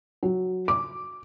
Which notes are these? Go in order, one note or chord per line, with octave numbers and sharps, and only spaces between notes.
F#3
D6